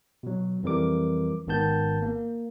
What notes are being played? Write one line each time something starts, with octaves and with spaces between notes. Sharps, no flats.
B2 F#3
F2 E3 G3 A#4 D6
G#1 G#2 D#3 B3 A5 G6
A#3